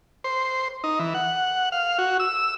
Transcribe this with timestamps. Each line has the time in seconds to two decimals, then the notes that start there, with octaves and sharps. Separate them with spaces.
0.24 C5
0.84 D#4
0.99 E3
1.14 F#5
1.72 F5
1.98 F#4
2.20 E6